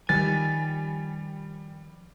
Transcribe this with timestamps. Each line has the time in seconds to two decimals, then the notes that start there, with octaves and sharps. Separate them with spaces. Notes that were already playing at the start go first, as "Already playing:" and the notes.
0.09 D#3 F3 G3 G#5 A6